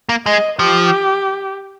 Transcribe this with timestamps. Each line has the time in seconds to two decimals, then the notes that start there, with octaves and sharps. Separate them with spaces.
0.09 A#3
0.26 G#3 D#5
0.59 F3 G4